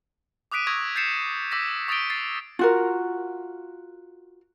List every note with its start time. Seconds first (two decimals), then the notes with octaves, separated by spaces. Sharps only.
0.52 D6 D#6 F#6 B6 D7 D#7
0.67 C#6 D#6 E6 G#6 A#6
0.96 G6 A6 C7 C#7 E7
1.51 D6 E6 A#6 B6
1.88 C#6 D#6 A6 A#6 D7 G7
2.10 A6 C7 D7
2.59 F4 F#4 A#4